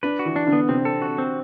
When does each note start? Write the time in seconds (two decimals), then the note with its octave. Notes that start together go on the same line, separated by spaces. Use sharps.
0.03 D4 B4
0.19 F#4
0.25 E3
0.36 D4
0.47 D3
0.53 B3
0.69 C3 C4
0.85 A4
1.02 F#4
1.18 C4